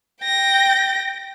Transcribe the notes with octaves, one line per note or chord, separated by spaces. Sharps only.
G5 A#6